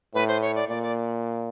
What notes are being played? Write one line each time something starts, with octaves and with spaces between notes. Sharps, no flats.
A2 B4
C5
C#5
D5
A#2 D5
D5